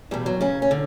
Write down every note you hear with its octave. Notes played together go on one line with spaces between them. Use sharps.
E2 B2 G3
F#3
C#3 C#4
C#4
D3